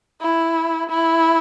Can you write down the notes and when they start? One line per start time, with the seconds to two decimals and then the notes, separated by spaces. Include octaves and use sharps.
0.21 E4
0.90 E4